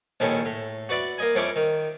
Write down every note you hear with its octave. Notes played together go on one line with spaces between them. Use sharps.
A#1 D#2 D#3 C#4 E4 A4
A2
F#4 B4 D5 E5
A#3 D#5 G#5
F2 C4 C#4 E4 G5 D6
D#3